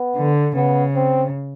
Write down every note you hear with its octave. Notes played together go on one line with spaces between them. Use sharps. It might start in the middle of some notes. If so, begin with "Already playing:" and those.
Already playing: B3
D3
C#3 B3
C4